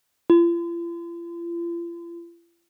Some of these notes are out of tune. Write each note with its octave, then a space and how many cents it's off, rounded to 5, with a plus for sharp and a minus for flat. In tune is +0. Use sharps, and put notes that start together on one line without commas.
F4 -45